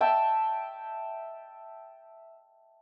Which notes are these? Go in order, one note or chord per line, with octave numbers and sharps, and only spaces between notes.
E5 G5 A5 E6